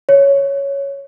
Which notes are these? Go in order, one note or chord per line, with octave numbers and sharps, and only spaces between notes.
C#5